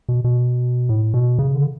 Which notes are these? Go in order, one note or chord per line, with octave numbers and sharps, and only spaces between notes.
B2
B2
A2
B2
C#3
D3